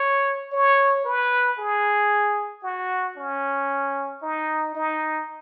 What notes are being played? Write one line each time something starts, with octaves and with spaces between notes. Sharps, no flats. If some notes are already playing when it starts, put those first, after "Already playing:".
Already playing: C#5
C#5
B4
G#4
F#4
C#4
D#4
D#4